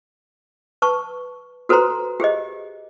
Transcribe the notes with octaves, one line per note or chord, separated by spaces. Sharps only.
B4 A5 C#6
F#4 A4 B4 C5 A#5 C6
G4 G#4 C5 D#5